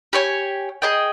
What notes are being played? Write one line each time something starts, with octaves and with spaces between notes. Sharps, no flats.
G4 C#5 G#5
G#4 D#5 G5